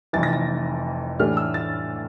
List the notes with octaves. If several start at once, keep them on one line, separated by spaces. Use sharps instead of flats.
F1 F2 E3 A6
A#6
A6
A2 E3 A3 D4 F6
E6
A6